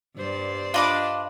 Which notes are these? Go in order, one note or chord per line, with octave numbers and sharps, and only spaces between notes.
G2 C5 D5
D4 F4 D#5 B5 D6